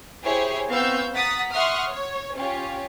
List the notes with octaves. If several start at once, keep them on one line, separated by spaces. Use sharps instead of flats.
E4 G4 G#4 C5 C#5
B3 C4 F5 C#6 E6 G6
F#5 A#5 D#6 A6 B6
E5 F#5 C6 C#6 D#6 F6
C#5
C#4 F4 G4 C#5